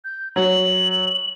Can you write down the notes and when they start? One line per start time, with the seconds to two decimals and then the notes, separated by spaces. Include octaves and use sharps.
0.05 G6
0.36 F#3 F#7